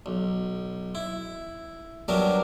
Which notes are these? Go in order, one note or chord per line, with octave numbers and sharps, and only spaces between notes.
B1
E4
F#3 G3 B3 D4 A#4 E5